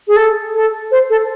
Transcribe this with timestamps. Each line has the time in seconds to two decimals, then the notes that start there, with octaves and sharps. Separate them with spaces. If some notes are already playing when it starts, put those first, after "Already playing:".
0.08 G#4
0.16 A4
0.54 A4
0.91 C5
1.10 A4